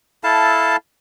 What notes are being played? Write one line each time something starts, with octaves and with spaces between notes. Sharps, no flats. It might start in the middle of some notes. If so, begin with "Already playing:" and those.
E4 A4 F5 A5